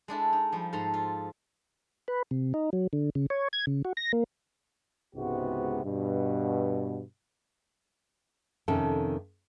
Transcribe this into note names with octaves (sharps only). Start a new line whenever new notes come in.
G#3 D4 E4 A4
D#4
F3 G3
G#2 A4 A#5 C6
F4
B4
C3
D#4
F#3
D3
C#3
C#5
G#6
C#3
F#4
A#6
A#3
C#2 G#2 C3 B3 F#4
G2 B2
F2 C3 D#3 C#4 A4 G5